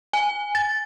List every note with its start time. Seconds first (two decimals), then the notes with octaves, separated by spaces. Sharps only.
0.13 G#5
0.55 A6